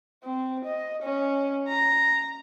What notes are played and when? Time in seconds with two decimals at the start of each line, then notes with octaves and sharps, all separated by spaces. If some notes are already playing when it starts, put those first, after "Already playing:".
0.23 C4
0.65 D#5
1.03 C#4
1.68 A#5